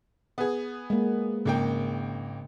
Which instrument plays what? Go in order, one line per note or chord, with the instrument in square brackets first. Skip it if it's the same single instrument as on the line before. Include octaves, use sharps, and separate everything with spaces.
[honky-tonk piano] B3 G#4
[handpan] G#3 A#3
[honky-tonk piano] G#1 A#3 G5 [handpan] C#3